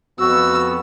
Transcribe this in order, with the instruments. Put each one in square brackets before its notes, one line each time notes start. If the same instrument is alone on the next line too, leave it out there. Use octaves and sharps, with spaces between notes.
[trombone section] F2 B3 [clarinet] F#4 [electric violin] E6